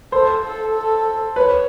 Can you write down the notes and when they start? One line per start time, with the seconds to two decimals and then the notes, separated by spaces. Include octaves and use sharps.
0.12 A4 C5
0.43 A4
0.75 A4
1.36 B4 C#5